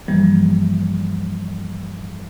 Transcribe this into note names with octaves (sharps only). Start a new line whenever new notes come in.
G2 E3 F3 G3 A#3